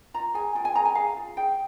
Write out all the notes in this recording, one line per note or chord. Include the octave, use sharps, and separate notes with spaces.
F4 A#5
G#4 G#5
F4 G5
G#5
G#4 A#5
G#5
G#4 F5
F4
G#4 G5